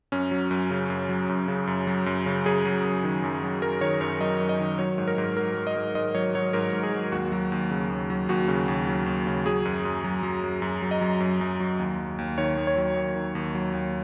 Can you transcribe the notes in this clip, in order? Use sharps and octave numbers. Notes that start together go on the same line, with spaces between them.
F#2 C#4
F#3
F#2
C#3
F#2
F#3
F#2
C#3
F#2
F#3
F#2
C#3
F#2 G#4
F#3
F#2
D#3
F#2
F#3
F#2 A#4
D#3 C#5
F#2 C#5
F#3 D#5
F#2
D#5
D#3
F#3 C#5
G#2
A#4
G#2
F#3 A#4
F#3
D#5
G#2
G#2 D#5
F#3 C#5
F#3 C#5
G#2 A#4
G#2
G#4
F#3
D#2 F#4
F#3
D#2
C#3
D#2
F#3
D#2 F#4
C#3
D#2
F#3
D#2
C#3
F#3 G#4
F#2
F#2
F#3
F#3
F#2
F#2
F#3
D#5
F#3
F#2
F#2
F#3
D#2
F#3
D#2
D#3 C#5
D#2
C#5
F#3
D#2
D#3
D#2
F#3
D#2